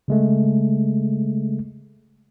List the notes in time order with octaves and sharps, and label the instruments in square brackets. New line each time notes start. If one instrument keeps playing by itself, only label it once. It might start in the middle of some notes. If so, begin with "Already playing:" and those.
[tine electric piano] C#3 G#3 A3